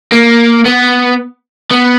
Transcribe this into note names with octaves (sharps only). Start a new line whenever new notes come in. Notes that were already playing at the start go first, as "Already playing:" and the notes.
A#3
B3
B3